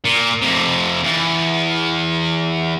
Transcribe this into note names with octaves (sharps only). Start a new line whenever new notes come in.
A#2
F2 C3
E2